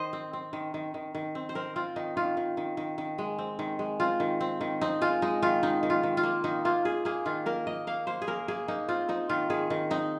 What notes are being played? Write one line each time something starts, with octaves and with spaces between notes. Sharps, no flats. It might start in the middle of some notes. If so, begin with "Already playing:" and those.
Already playing: D#3 C5 D#5
C4
C4
D#3
D#3
D#3
D#3
C4
C5
C4 A#4
C4 F4
D#3 D#4
D#3 F4
D#3
D#3
D#3
D#3
G#3
C4
D#3
G#3
C4 F4
D#3
C4
D#3
C4 D#4
G#3 F4
G#3 D#4
D#3 F4
D#3 D#4
D#3
F4
D#3
F4
A#3
D#3 D#4
A#3 F4
A#3 G#4
A#3 G#4
D#3 F4
A#3 A#4
A#3 D#5
A#3 F5
A#3 C5
G#4
A#3 A#4
A#3 G#4
A#3 D#4
C4 F4
C4 D#4
D#3 F4
D#3 G#4
D#3
C4 D#4